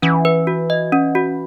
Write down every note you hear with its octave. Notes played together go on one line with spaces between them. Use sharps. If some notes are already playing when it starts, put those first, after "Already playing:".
E3 C#4
B4
F#4
D#5
C#4
F#4